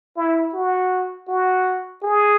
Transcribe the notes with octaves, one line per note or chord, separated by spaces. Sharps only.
E4
F#4
F#4
G#4